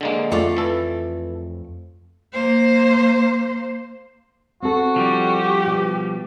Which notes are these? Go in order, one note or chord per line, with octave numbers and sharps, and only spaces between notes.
D3 G#3 A#3
F2 A3 F4 D5
E3 A4
A#3 C5
C4 F#4 A4
F3 G3 D4 G4
B2